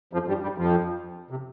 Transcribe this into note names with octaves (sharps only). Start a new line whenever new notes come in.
F2 F3
G2 G3
G2 G3
F2 F3
C3